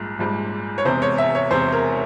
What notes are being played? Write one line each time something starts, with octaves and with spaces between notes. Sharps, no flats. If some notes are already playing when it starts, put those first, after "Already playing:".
Already playing: A#1 G#2 G3
A#1 G#2 G3
C#5
E1 E2 C3 C5
C#5
E5
C#5
E1 E2 C3 C5
A#4